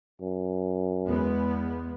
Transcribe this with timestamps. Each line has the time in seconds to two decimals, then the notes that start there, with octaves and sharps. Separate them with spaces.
0.22 F#2
1.06 E2 G#3 B3